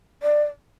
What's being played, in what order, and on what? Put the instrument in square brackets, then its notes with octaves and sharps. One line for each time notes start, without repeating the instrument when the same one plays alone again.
[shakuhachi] D5